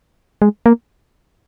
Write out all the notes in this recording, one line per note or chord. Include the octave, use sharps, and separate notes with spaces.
G#3
A#3